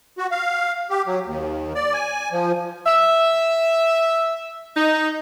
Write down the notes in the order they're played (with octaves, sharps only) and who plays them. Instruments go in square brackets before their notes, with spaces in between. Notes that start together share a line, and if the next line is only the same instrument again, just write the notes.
[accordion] F#4
F5
G4
F#3
D#2
D5
G#5
F3
[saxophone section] E5
D#4